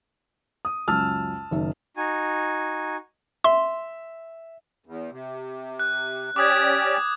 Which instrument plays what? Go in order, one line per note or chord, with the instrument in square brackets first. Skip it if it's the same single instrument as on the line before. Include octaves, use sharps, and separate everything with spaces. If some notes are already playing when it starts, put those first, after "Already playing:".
[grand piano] D#6
[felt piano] C#2 F#2 [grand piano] A5 E6 F6
[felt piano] F#1 D#3 E5
[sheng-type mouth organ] D#4 F#4 G#5
[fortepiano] E5 [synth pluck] C6
[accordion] E2
C3
[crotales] F#6
[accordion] C#4 G4 D5 [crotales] D6 D#6 G#6